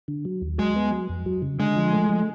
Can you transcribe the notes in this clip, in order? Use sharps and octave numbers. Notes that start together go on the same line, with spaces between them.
D3
F#3
D#2
F#3 G#3
B3
F#3
F2
F#3
C#3
D3 G#3
F3
A3
F3